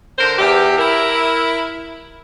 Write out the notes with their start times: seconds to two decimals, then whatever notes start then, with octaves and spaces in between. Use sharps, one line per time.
0.18 D3 A#4 C5
0.38 E2 G4
0.78 E4 A#4